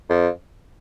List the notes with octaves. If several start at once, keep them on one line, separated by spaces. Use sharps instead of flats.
F2